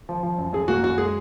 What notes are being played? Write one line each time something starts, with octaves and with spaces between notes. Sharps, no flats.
F3
F3
F#2
F#2 G#4
A#3 F#4
F#2 F#4
G#3 G#4